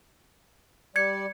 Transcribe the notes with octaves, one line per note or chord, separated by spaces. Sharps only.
G3 D5 G#6 C#7